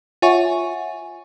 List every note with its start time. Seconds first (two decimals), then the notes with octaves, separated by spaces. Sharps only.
0.22 F4 C#5 E5 F#5 G#5 C#6